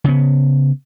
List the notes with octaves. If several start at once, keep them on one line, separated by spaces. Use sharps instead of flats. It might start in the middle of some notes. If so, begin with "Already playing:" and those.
C#3 B3